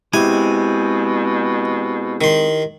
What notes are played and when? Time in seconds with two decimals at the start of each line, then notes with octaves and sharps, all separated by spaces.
0.14 B2 G#3 C4 E4 G4 G#5
2.21 D#3 C6